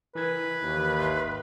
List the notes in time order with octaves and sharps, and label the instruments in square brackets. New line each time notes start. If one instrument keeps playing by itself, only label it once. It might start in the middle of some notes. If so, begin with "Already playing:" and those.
[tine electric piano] E3 A#4 G#6 [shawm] B4
[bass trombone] D#2
[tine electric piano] G#1 E5 C6